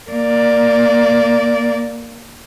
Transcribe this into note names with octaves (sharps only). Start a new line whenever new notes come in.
A#3 D5